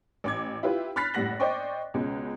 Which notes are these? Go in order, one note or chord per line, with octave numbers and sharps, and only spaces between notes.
A1 D6 G#6
E4 F4 G4 B4
B5 F6 F#6 A6 B6 C7
F#1 A2 G3 F#5 A#6 F#7
C5 D5 D#5 G5 C#6 D6
C#2 B2 G#3 C#4